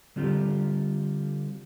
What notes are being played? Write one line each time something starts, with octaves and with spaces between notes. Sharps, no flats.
D3 G3 C4 F4 G4